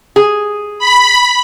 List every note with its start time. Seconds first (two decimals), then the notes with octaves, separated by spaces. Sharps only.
0.16 G#4
0.79 B5